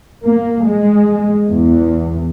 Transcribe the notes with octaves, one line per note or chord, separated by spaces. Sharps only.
A#3
G#3
E2